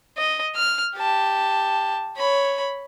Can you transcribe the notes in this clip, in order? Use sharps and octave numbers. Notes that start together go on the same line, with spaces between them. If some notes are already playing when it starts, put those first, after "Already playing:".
D#5
F6
G4 A5
C#5 B5